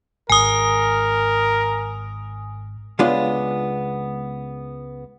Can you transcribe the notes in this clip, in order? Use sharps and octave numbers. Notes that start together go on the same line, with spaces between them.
G#1 A#4 G#5 D#6
C#2 G#3 B3 D4 F4